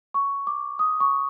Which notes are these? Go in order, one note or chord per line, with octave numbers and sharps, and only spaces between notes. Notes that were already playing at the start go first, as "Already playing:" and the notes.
C#6
D6
D#6
C#6